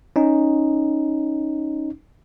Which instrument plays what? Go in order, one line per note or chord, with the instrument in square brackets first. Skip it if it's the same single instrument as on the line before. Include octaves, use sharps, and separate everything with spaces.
[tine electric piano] C#4 D#4